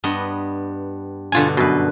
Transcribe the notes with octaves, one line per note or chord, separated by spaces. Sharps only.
G2 B3 D#5
G2 B2 D3 F4 G#5
F#2 B2 B4 C6